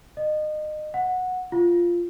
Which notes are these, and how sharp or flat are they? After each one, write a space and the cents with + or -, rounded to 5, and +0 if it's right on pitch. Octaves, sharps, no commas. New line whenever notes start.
D#5 -30
F#5 -10
F4 -5